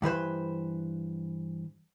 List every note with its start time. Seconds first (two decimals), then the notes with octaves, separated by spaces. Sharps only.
0.02 G2 E3 B4 C5